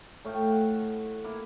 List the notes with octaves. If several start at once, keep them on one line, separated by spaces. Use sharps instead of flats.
A2 A3 F5 G5
F#5
A#3 E4